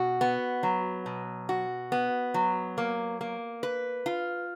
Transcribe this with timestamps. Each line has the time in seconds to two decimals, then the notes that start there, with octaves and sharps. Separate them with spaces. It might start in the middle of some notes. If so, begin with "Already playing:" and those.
Already playing: B2 F#4
0.21 B3
0.63 F#3
1.06 B2
1.49 F#4
1.92 B3
2.34 F#3
2.78 A#3
3.21 A#3
3.63 B4
4.06 F4